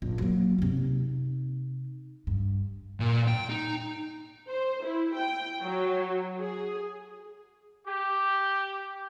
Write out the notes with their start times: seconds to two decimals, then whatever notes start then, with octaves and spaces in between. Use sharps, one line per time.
0.02 A#1
0.18 F#3 A#3
0.58 C3 D#4
2.27 G2
3.00 A#2
3.28 G5
3.50 D#4
4.48 C5
4.84 E4
5.17 G5
5.63 F#3
6.40 G#4
7.87 G4